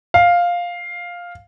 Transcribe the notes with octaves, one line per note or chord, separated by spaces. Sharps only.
F5